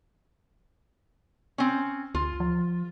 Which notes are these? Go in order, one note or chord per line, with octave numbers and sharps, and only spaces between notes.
C4 C#4
D2 F4
F3